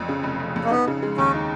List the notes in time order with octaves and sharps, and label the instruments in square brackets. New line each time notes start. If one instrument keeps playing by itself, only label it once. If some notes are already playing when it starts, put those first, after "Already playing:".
Already playing: [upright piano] F1 F2
C#3
F1
F1
F2
[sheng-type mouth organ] A#3
[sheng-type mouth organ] B3 [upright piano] D#4
[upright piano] C#3
G#3
[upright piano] D#2 [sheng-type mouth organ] C#4
[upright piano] D#4